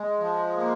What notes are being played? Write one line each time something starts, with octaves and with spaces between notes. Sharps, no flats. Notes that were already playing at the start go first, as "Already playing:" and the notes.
Already playing: G#3
F3
A#3